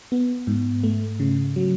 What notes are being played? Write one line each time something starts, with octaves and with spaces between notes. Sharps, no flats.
B3
G#2
A3
C#3
F#3